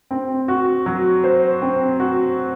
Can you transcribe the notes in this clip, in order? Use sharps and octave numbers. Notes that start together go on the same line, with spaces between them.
C4
F#4
F#3
C5
C4
F#4